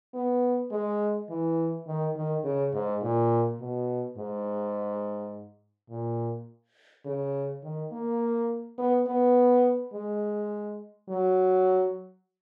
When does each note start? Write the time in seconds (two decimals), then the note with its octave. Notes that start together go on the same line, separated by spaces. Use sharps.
0.14 B3
0.72 G#3
1.30 E3
1.88 D#3
2.16 D#3
2.45 C#3
2.74 G#2
3.03 A#2
3.61 B2
4.18 G#2
5.90 A#2
7.06 C#3
7.64 D#3
7.92 A#3
8.78 B3
9.07 B3
9.94 G#3
11.09 F#3